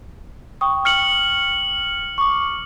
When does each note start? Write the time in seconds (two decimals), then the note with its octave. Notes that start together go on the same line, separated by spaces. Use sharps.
0.61 G5 C#6 D#6
0.85 F6 C#7 F#7
2.18 C#6 D6